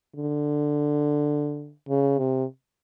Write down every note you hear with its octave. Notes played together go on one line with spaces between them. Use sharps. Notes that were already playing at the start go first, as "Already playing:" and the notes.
D3
C#3
C3